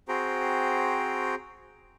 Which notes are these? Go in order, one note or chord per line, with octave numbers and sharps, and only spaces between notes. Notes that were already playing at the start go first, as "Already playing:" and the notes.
C4 F#4 G#4 C5 G5 A#5